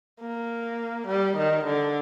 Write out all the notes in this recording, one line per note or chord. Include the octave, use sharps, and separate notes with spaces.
A#3
G3
D#3
D3